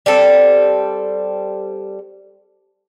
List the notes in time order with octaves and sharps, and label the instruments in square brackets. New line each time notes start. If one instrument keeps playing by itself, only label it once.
[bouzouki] G3 C4 A4